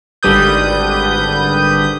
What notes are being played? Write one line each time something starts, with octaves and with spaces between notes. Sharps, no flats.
G#1 D3 G3 B4 D#6 G6